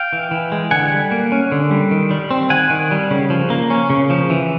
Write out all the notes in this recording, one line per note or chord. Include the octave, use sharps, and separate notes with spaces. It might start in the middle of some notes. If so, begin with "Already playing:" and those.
Already playing: F5 G5
E3
E3
G#3
D3 F#5 G#5
G3
A#3
C#4
D3
G3
D#3
G3
C4
D#3 F#5 G#5
D#3
G3
C#3
F3
A#3
C#4
C#3
F3
E3